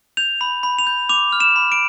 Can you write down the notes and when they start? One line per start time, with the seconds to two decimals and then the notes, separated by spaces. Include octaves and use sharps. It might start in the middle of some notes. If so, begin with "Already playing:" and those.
0.17 G6 F7
0.41 B5
0.63 B5
0.79 F7
0.87 G6
1.09 D6 F7
1.33 F6
1.40 E7
1.56 B5
1.72 D7